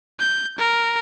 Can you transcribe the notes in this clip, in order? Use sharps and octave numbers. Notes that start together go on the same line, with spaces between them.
G6
A#4